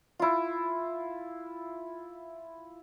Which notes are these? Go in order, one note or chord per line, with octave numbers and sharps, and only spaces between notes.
E4 F4